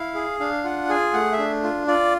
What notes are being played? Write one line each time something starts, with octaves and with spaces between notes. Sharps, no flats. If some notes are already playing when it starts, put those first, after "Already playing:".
Already playing: E4 F5
G#4
D4 F5
F4 F#5
G#4 G#5
A3 F#5
E5
D4
F4
F4 D5